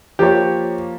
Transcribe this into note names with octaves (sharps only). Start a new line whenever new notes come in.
F3 A#3 G4 C#5